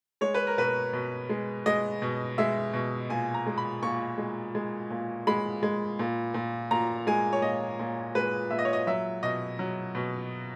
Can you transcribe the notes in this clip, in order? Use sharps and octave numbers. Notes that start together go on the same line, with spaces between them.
G#3 C#5
B4
A#4
B2 B4
B2
G#3
G#3 D#5
B2
G#3 E5
B2
A#2 G#5
A#5
G#3
B5
A#2 C#6
G#3
G#3
A#2
G#3 B5
G#3
A#2
A#2
A#2 A#5
G#3 G#5
C#5
A#2 D#5
A#2
G#3 B4
A#2 E5
D#5
C#5
D#5
F#3 E5
B2 D#5
F#3
B2